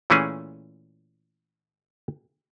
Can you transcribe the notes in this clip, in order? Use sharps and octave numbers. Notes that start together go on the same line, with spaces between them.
A#2 E3 A3 C#4 G#4